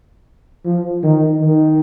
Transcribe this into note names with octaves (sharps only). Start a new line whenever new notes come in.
F3
D#3
D#3